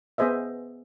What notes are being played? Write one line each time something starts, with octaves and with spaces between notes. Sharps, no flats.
B3 G#4 C5 D#5 E5